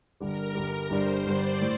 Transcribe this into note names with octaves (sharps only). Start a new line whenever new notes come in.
G1 G2 D3 G3 A#4
G1 G2 D3 G3
G1 G2 D3 G3 C5
G1 G2 D3 G3 D5
A2